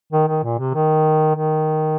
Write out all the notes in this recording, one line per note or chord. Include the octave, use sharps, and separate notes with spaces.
D#3
D#3
A#2
C3
D#3
D#3